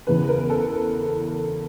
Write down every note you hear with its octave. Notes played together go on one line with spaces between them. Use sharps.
E2 C#3 E3 B4
A#4
A4